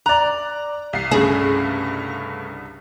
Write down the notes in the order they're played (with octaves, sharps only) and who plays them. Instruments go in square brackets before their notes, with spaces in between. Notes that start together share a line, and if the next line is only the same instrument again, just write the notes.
[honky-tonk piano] D5 F#6 [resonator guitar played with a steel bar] A#5
[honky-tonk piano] C2 C7
[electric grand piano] G2 C#3 A3 [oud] G#4